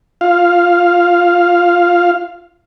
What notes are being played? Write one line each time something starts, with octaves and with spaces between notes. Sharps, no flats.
F4 F5